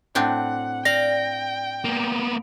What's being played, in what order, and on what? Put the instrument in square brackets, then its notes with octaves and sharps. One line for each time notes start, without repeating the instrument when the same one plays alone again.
[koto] A2 C4 D4 [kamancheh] F#5
[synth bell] D5 A#6 [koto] F5 [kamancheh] G5
[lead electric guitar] A#3 B3